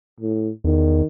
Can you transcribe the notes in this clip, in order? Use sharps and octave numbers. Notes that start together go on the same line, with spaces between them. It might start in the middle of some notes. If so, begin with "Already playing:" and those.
A2
E2 D#3